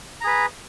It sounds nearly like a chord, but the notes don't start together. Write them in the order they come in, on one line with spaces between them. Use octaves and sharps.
A#5 G#4 B4